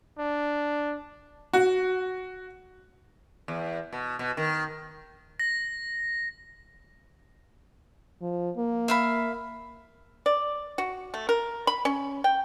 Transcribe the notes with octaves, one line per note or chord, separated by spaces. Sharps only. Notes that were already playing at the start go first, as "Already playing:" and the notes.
D4
F#4
E2
B2
B2
D#3
A#6
F3
A#3
E5 F5 B5
D5
F#4
A3
A#4
B5
C#4
G5